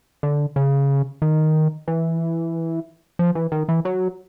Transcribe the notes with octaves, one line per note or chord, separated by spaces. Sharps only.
D3
C#3
D#3
E3
F3
E3
D#3
E3
F#3